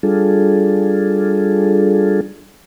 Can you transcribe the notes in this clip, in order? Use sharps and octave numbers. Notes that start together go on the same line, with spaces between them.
G3 D4 F4 G#4 A4